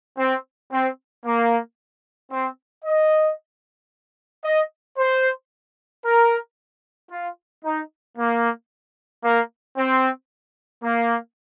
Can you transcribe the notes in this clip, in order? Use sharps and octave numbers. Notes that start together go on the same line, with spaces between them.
C4
C4
A#3
C4
D#5
D#5
C5
A#4
F4
D#4
A#3
A#3
C4
A#3